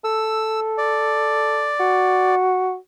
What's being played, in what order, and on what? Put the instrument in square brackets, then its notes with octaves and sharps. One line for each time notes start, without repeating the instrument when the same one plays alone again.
[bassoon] A4 [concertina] E6
[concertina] D5
[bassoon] F#4